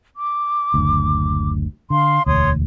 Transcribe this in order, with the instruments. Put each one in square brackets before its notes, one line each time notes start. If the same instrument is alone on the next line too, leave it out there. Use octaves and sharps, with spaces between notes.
[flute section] D6
[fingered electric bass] F#1 D2
[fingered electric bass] D3 [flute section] F5 C6
[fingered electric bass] E1 D2 [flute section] C#5 C6 D#6